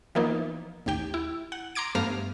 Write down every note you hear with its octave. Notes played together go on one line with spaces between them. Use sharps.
E3 F3 A#3 B3 D#4
A1 D#2 G4 G5
E4
F#5
A#5 C6 D6 G#6 D7
G2 A3 B3 F5 A#5 F6